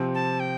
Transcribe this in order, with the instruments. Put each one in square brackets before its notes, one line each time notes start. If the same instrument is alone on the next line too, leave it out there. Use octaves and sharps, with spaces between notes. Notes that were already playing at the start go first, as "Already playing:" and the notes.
Already playing: [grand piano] C3 F3 C4
[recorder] A5
G5